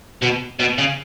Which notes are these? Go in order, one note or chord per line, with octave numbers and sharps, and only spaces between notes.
B2
B2
C#3